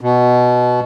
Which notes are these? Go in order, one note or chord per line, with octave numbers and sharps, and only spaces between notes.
B2